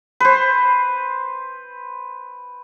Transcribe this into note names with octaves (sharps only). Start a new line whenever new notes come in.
B4 C5